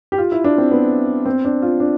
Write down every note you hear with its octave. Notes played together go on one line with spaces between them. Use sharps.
G4
F4
E4
D4
C4
B3
C4
D4
F4
D4